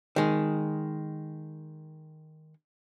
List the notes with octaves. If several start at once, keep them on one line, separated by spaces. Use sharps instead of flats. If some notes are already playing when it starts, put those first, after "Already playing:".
D#3 G#3